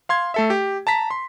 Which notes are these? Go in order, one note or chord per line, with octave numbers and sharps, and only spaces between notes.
F5 C6 G#6
A3 A4 E5
G4
A5 A#5 B6
C6